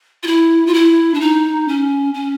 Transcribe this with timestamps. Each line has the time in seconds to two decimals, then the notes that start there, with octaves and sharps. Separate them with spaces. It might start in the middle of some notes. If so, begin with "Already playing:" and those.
0.23 F4
0.27 E4
0.67 F4
0.74 E4
1.14 D4
1.21 D#4
1.68 C#4
2.14 C#4